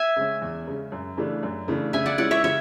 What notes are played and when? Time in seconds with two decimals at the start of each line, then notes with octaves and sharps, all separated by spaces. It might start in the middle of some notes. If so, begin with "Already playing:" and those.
Already playing: E5 G#5
0.16 C#3 G#3 C#4
0.41 E2
0.67 C#3 G#3 C#4
0.92 F#2
1.17 C#3 E3 A3 D4
1.43 F#2
1.68 C#3 E3 A3 D4
1.93 C#3 E5 G#5
2.06 D5 F#5
2.18 G#3 C#4 E4 D5 F#5
2.31 C#5 E5
2.44 C#3 C#5 E5